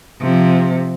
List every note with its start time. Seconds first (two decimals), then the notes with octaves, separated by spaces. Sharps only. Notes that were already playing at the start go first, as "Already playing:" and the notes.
0.21 C3 F3